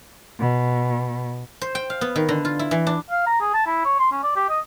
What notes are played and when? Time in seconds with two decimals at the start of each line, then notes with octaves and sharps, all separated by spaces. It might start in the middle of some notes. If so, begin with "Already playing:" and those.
0.39 B2
1.61 C5
1.75 G5
1.90 F5
2.01 B3
2.16 D#3
2.29 D3
2.45 F4
2.59 E4
2.71 E3
2.87 D4
3.10 F5
3.26 A#5
3.41 G#4
3.54 A5
3.66 E4
3.85 C#5
3.99 C6
4.12 C#4
4.23 D5
4.36 G4
4.49 D#5